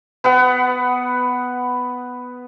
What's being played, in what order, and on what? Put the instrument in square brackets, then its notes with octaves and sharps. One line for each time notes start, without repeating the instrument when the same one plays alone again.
[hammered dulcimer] B3 B4 F#5